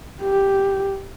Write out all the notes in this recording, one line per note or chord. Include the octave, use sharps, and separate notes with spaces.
G4